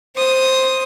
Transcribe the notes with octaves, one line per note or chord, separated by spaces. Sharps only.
C5 D#6